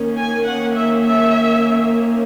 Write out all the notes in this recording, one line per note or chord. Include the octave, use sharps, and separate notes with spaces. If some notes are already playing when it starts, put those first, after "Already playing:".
Already playing: D#3 A#3 C#4
G#5
F#5
E5
E5